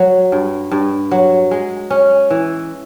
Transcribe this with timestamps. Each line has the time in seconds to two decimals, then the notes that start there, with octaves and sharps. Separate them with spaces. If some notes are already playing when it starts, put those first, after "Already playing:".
Already playing: F#3
0.32 G2
0.71 G2
1.11 F#3
1.51 G#3
1.90 C#4
2.30 E3